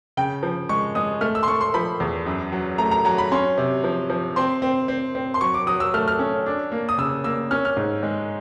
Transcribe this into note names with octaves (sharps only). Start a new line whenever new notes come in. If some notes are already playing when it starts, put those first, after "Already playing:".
C#3 G5
F3
G#3 C#6
G#3 D#6
A3 F6
E6
C6
A3 C#6
C6
F3 B5
E2
F#2
F#3
A3 A#5
A#5
F#3 A#5
B5
C#4 C6
C3
F3
F3
C4 C6
C4
C4
C4
C6
F#3 C#6
D6
F#3 D#6
E6
A3 F6
F6
C#4
D4
A#3
D#6
C#3 E6
A#3 E6
C#4 F6
F6
G#2
G#3